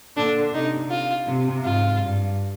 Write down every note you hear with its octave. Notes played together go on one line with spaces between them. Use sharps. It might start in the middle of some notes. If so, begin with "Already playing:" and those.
A#2 D3 D4
C3 D#4
F4
C3
G#2 F4
G2